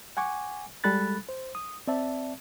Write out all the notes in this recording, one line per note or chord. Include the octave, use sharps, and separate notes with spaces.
F#5 G#5 C#6 D6
G3 G#3 A4 B5 F#6 A6
C5
D#6
C4 D5 E5 A5